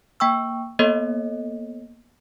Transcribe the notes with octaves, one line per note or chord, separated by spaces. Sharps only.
A#3 G5 C#6 E6
A#3 B3 A4 C#5 D#5